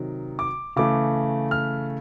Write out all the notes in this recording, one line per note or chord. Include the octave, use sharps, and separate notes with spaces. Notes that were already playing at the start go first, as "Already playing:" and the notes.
Already playing: C3 D#3 F#3
D6
C#3 E3 A3 D6
F6